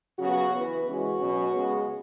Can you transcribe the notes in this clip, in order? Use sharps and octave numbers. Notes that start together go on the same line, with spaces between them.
C#3 F#3 B3 F#4
E3 B3 B4
C#3 E3 G#3 C#4 F#4
B2 F#3 C#4
C#3 G#3 B3